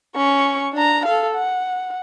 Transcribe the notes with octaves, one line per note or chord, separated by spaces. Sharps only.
C#4 C#6
D4 A#5
A4 F5
F#5